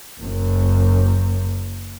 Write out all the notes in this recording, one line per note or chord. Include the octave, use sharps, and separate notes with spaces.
F#1 F#2